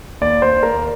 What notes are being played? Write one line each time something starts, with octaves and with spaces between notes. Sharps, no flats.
D#2 D5
C5
D#2
A#4